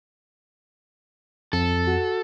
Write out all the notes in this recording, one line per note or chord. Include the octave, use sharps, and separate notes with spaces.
F2 A4
F#4